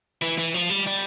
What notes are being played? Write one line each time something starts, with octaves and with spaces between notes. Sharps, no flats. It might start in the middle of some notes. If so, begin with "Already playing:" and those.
E3
E3
F3
G3
G3